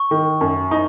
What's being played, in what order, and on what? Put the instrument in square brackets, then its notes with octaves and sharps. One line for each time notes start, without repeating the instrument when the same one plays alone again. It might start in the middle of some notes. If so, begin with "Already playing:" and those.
Already playing: [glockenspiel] C#6
[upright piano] D#3
F#2
D#4